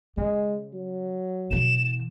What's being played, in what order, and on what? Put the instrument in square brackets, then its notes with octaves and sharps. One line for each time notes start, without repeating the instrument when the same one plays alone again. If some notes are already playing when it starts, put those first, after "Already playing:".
[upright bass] C#3 [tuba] G#3
[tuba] F#3
[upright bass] B2 E3 [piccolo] E7